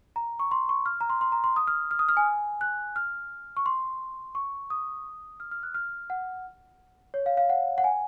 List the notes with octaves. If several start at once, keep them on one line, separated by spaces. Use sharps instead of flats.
A#5
C#6
C6
C#6
F6
A#5
C6
C6
A#5
C6
D#6
F6
F6
D#6
F6
G#5
F#6
F6
C#6
C6
C#6
D#6
F6
F6
F#6
F6
F#5
C#5
F5
F5
F#5
F#5
G#5